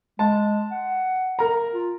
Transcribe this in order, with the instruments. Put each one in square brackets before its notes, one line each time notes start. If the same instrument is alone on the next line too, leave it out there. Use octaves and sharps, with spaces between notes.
[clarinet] G#3 [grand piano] A5
[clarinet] F#5
[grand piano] A#4 A#5
[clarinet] F4